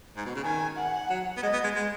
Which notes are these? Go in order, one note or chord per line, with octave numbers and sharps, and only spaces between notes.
G#2
B2
C#3
D#3 G#5
F#5
F#3
B3
G#3 D#5
B3
G#3
G#3